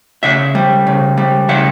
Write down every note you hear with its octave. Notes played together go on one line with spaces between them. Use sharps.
C#3 E5 F#5
G3
C#3
G3
C#3 E5 F#5